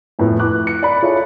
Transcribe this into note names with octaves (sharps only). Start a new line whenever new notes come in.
F2 A2 B3
D6 F#6
C#7
D5 B5
E4 F4 G#4 A4 C#5